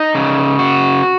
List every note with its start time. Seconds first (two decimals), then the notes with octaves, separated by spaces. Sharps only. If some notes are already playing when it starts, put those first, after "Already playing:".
Already playing: D#4
0.15 C#3
0.59 F#4